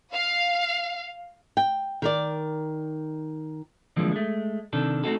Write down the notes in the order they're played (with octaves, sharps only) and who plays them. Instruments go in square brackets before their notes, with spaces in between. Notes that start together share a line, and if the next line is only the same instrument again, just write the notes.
[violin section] F5
[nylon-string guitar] G5
D#3 A#4 D5
[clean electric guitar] D3 E3 F3 G3 G#3 A#3
G#3 A3
C3 D#3 D4 A4
A3 A#3 C4 D#4 F#4 A4